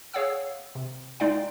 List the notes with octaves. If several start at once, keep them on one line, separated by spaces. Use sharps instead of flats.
G#4 C#5 F5 F#5 E6
C3
G#3 D#4 D5 F5 G5